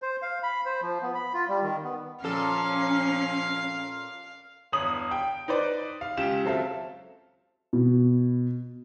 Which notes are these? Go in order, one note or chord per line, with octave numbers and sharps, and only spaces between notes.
C5
F5
B5
C5
F3
B3
B5
F4
G3
D#3
B3
A#2 F3 C#4 A4 F5
G1 E2 C#5 D#6 F#7
G5
D#4 B4 C5 D5
F5
C#2 F4 G4 E7
F#3 C4 F4 A4 E5 F5
B2